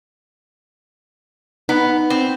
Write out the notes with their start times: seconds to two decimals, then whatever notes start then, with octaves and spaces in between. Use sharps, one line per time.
1.69 B3 D#4
2.10 C4